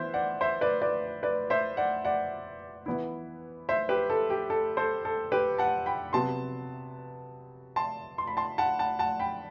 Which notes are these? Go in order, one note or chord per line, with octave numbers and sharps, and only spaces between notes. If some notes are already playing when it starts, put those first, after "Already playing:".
Already playing: E3 B3 E4 C5 E5
D5 F#5
C5 E5
B4 D5
B4 D5
B4 D5
C5 E5
D5 F#5
D5 F#5
E3 B3 E4
C5 E5
G4 B4
A4
G4
A4
A4 C5
A4
G4 B4
F#5 A5
G5 B5
C3 F#3 B3 A5 C6
A5 C6
C6
B5
A5 C6
F#5 A5
F#5 A5
F#5 A5
G5 B5